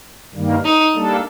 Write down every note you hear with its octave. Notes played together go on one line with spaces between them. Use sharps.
G2 D#3 G3 A#3
D#4
G3 A#3 D4 A4